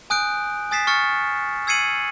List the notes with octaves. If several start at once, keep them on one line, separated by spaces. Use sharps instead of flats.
G#5 D#6 F#6 G6 D7
G#5 D#6 A6 B6 C7 E7
C#6 F6 F#6 A6 C#7
E6 G#6 C7 C#7 D#7 F#7